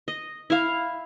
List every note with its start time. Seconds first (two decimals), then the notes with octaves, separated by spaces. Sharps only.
0.08 D#5
0.50 E4 F5